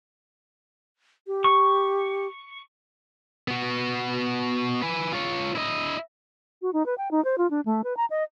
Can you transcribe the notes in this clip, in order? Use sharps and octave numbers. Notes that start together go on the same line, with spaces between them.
G4
C#6
B3 F#4
B4 G#5
F4 C#5
E4 D#5
F#4
D#4
B4
G5
D#4
C5
F4
D4
A3
B4
A#5
D#5